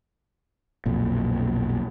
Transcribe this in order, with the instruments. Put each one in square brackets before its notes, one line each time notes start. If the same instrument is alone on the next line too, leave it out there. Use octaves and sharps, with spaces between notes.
[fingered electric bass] B1 F2 A#2